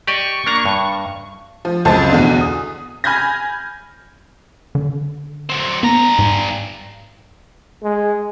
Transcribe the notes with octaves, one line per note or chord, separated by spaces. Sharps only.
G4 D5 D#5 C#6
A#3 D4 A#5
G2
F3
C#2 F#2 C4 A4 A5 A6
E2 B2 D3 D4
D#6
G#5 B5 F6 G6 G#6 A#6
D3
F#3 C4
G2 B3 A#5
G#2
G#3